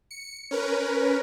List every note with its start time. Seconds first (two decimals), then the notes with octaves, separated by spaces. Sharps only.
0.11 C#7
0.51 C#4 A#4 B4